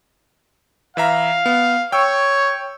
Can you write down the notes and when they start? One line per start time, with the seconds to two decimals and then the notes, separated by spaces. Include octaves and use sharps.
0.97 E3 E5 F5 A#5
1.46 B3
1.92 C#5 G5 E6